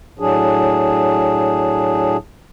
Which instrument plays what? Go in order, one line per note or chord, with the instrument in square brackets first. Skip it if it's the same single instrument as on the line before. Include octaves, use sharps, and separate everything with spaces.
[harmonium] A2 F#3 D4 G#4